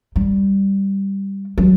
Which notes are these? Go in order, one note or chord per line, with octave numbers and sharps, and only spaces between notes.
G3
F#3